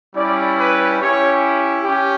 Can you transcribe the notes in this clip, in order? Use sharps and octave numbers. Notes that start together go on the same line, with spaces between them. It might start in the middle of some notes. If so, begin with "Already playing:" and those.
G3 C#4 E4 D5
B4
C#4 E4 G4 C#5
C#4 G4